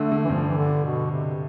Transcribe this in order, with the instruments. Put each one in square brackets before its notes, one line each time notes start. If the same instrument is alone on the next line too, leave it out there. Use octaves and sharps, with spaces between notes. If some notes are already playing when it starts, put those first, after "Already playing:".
Already playing: [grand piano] D3 [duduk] A3
[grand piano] D3
[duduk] E3
[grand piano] G2 [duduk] F3
[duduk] E3
D3
B2
C3